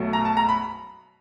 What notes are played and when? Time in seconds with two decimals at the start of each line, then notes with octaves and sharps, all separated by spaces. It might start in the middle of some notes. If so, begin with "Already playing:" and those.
Already playing: B1 B2 F#3 A3
0.13 A#5
0.25 A5
0.37 A#5
0.49 B5